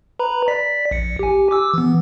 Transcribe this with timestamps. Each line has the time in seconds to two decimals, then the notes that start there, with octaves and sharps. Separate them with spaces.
0.20 B4 A#5 B5
0.48 D5 B6
0.91 A#1 C#7
1.19 G4 G#5
1.51 D6 E6
1.74 E3 B3